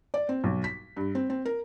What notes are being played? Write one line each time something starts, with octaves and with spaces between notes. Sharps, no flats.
D5
C4
B1
B6
G2
C4
C4
A#4